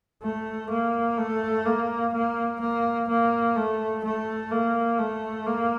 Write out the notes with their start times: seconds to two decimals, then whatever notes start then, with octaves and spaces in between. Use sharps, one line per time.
0.22 A3
0.70 A#3
1.18 A3
1.65 A#3
2.13 A#3
2.60 A#3
3.08 A#3
3.56 A3
4.04 A3
4.51 A#3
4.98 A3
5.46 A#3